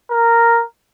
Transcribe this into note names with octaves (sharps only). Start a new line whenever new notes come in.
A#4